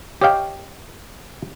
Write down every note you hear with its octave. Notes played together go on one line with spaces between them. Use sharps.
G4 C#5 D#5 F5 G5